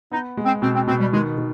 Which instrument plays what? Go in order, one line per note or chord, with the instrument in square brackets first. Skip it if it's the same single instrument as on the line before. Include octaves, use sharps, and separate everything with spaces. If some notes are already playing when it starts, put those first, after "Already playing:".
[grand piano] B3 [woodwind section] D#4
[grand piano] G#3
[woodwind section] C4
[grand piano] B2 [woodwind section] C4
[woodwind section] C4
[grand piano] B2 [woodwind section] C4
[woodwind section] G3
[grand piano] D#3 [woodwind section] G#3
[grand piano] D#3